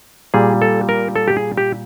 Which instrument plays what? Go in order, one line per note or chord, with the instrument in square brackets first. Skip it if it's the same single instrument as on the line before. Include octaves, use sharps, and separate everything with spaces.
[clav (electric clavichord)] A#2 G3 G#4
A4
A#4
A4
G4
G#4
G4